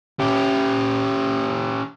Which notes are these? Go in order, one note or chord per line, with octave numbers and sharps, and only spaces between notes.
C#4 G4